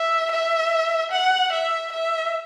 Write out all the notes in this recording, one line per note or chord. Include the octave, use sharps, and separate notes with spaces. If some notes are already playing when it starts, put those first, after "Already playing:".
Already playing: E5
E5
F#5
E5
E5